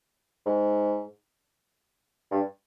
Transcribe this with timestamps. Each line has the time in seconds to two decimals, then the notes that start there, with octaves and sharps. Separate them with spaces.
0.46 G#2
2.31 G2